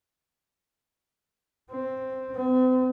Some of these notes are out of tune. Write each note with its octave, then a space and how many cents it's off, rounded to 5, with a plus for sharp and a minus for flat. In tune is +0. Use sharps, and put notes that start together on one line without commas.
C4 +0
C4 -40